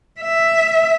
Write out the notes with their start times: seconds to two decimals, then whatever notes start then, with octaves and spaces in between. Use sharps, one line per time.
0.21 E5